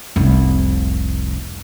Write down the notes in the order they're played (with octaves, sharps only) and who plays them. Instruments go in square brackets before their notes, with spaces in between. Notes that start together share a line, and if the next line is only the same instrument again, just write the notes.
[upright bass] F1 C2